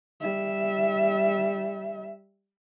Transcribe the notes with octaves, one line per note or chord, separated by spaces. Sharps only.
G3 E5